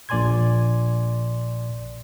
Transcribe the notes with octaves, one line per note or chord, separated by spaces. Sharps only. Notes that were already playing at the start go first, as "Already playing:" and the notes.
A#1 A#2 D5 G#5 C6 G#6